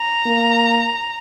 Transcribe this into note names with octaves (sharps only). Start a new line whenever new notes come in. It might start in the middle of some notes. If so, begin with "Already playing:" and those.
Already playing: A#5
A#3